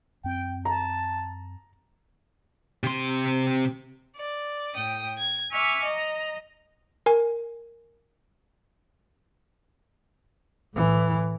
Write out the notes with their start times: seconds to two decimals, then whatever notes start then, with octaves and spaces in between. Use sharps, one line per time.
0.24 F#2 C4 G5
0.65 A5 A#5
2.84 C3 C6
4.16 D5
4.75 A2 G5 D#6
5.18 G#6
5.51 E5 G#5 C#6 D6 F6
5.84 D#5 A#5
7.06 A#4 G#5
10.74 A2 E3